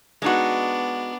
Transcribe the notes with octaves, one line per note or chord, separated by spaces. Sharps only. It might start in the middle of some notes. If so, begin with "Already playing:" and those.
G#3 B3 D4 D#4 F#4